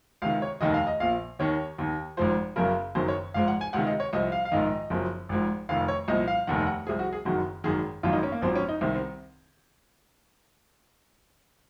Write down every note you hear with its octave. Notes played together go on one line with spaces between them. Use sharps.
C#2 C3 D#3 F5
C#5
F1 D#2 D#3 D#5
F5
D#5
A#1 A#2 F3 F5
D#2 D#3 C#5
D#2 D#3
G#1 G#2 F3 C5
F#1 F#2 C#3 A#4
F#1 F#2 D#3 C5
C#5
G#1 G#2 F3 F5
F#5
G#5
C#2 C3 D#3 F#5
D#5
C#5
C2 C3 F3 D#5
F5
F5
A#1 G#2 D#3 D#5
F#1 F#2 F3
G#1 G#2 F3
F1 F2 D#3 F5
C#5
C2 A#2 F3 D#5
F5
F1 D#2 D#3 F#5
F#5
C2 C3 F3 G#4
F#4
G#4
F#1 F#2 D#3 F#4
G#1 F#2 D#3 G#4
G#1 F#2 D#3 F4
D#4
C#4
A#3
G#1 F#2 F3 C4
C#4
D#4
C2 C3 D#3 C4
C4